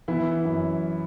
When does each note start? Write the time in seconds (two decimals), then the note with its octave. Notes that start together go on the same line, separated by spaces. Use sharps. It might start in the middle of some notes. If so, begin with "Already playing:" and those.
0.08 E3 B3 E4
0.45 F#2